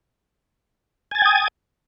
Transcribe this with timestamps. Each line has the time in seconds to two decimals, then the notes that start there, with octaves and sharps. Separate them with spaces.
1.11 G#5
1.15 A6
1.18 G#6
1.22 G5
1.25 D#6